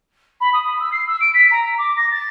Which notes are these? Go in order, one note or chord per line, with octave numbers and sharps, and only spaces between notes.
B5
D#6
E6
C7
E6
D7
B6
A#5
D6
A#6
A6